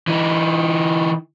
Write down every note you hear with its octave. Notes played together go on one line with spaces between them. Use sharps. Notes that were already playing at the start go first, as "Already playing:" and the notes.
E3 D#4